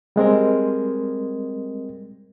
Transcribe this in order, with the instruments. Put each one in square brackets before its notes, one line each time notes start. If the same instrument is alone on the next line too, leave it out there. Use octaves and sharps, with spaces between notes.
[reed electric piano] G3 G#3 C4 A#4